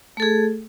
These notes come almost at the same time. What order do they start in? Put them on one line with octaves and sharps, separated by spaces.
A3 A4 G#4